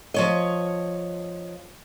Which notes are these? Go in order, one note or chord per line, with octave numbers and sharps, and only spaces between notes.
F3 C#5 D#5